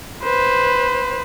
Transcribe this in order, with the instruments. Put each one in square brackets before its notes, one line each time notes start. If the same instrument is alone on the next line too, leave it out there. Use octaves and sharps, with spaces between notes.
[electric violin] B4 C5